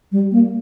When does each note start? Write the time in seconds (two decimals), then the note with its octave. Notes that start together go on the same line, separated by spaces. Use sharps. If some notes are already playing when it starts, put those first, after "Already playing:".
0.12 G3
0.32 A#3